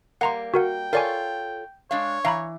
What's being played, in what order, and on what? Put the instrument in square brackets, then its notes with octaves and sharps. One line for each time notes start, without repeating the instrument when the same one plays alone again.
[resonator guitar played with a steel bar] G3 A#3 [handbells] F#5 A#5 C6
[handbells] F#4 A#4 F#5 [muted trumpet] G5
[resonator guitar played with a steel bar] F4 A4 C#5 [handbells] A#4 D5 G#5
[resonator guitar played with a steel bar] G#3 D4 F5 [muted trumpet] C#5
[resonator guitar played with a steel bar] E3 [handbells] F5 A#5 B5